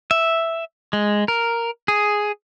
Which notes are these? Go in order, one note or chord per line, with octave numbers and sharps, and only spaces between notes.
E5
G#3
A#4
G#4